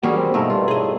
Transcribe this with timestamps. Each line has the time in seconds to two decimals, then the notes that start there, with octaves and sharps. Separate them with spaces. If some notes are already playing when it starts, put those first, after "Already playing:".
0.03 E3 G3 A#3 C#4 D4 F#4 G#4
0.17 C4
0.34 G2 B2 F3 A3 D#4 A#4
0.50 G2 F4
0.68 A2 G#4 D#5